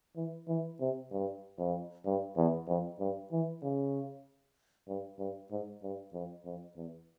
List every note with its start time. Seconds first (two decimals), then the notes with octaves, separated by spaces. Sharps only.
0.16 E3
0.48 E3
0.80 C3
1.11 G2
1.59 F2
2.06 G2
2.37 E2
2.68 F2
3.00 G2
3.31 E3
3.63 C#3
4.88 G2
5.19 G2
5.51 G#2
5.83 G2
6.13 F2
6.45 F2
6.76 E2